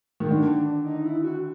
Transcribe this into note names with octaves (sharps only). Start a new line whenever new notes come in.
D#3
D3 D4
D4
D#4
E4
F#4